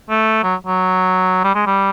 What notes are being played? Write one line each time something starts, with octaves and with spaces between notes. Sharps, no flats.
A3
F#3
F#3
G3
G#3
G3